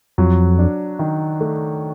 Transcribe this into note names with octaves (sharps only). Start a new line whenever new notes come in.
F2 F#3
D4
D#3
A3